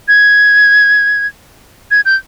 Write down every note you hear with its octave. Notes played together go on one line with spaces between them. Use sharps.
G#6
G#6
G6